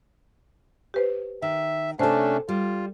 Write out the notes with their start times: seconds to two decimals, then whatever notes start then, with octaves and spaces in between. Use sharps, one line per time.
0.94 G4 B4 C5
1.42 D#3 E5
1.99 C3 A3 C#4 D4 A4 C5
2.49 G3 F4